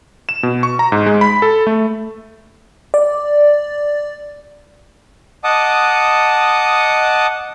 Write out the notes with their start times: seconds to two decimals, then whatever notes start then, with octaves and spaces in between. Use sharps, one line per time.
0.29 E7
0.43 B2
0.63 C#6
0.79 A#5
0.92 G#2
1.06 G#3
1.21 B5
1.42 A4
1.67 A3
2.94 D5
5.44 D#5 F#5 A5 D6 D#6